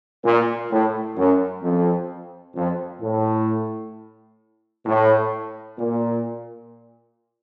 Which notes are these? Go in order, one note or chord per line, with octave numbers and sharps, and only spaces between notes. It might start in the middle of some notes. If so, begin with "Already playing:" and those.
A#2
A2
F#2
F2
F2
A2
A2
A#2